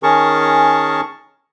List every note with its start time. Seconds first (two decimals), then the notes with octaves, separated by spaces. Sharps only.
0.03 D#3 C#4 G#4 A#4 A5 C#6